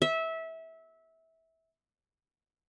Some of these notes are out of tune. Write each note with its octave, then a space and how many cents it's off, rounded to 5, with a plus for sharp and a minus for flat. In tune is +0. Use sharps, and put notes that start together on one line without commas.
E5 -20